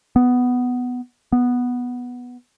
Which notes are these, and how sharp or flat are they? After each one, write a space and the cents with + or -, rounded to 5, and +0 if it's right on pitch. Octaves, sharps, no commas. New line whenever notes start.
B3 +5
B3 -5